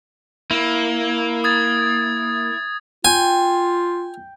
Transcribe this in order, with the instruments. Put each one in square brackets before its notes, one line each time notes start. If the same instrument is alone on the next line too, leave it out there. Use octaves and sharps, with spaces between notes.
[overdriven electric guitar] A#3 [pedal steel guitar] E4
[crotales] D#6 G#6 A6
[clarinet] F4 [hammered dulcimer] G5 [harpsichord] G#5